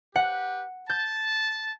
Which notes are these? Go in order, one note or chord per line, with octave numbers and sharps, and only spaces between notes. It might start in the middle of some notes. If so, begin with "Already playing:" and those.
G4 B4 F#5
A5 G6